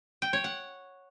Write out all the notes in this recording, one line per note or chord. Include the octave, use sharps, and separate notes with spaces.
G5
C#5
F#5